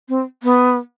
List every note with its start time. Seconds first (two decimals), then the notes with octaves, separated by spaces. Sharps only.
0.09 C4
0.43 B3